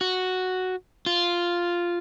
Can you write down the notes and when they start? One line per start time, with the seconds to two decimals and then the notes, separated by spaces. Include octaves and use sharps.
0.01 F#4
1.06 F4